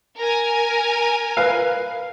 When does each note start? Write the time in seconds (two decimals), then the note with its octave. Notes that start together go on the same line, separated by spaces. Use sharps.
0.18 A#4 G#5
1.37 B4 F5